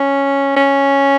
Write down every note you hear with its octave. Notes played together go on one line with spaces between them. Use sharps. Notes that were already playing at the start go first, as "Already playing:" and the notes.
Already playing: C#4
C#4